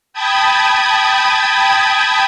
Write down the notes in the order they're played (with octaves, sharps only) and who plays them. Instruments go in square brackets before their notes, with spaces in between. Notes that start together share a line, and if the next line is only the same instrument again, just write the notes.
[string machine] G5 A5 B5 D#6 G#6